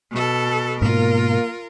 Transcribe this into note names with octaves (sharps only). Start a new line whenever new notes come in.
B2 A4
G#2 B2 A#3 F4 A#4